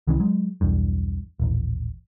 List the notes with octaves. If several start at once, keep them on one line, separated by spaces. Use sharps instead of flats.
C2 D#3 E3 C#4
F#3 G#3
B1 E2 G2
D#1 A1